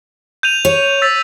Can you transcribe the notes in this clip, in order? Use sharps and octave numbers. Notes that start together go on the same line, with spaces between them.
G6 D#7 F7
C#5
E6 A6 B6